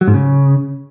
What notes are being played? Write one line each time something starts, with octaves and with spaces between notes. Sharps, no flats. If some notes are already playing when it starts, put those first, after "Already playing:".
F#3
G#2
C#3